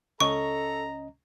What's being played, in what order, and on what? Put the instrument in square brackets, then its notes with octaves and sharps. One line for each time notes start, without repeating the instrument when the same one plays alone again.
[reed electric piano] C#2 C#4 D#5 [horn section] A4 [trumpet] A#5 [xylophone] C#6